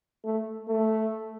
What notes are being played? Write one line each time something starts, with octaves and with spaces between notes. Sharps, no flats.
A3
A3